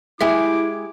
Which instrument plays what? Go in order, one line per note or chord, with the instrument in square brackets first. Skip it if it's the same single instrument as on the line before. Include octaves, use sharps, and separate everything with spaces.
[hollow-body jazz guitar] G#3 G4 G#4 [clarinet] E4 [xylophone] E5 [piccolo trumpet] D6